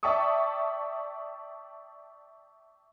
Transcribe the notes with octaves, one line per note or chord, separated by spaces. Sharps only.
D5 E5 G5 A5 C#6 D#6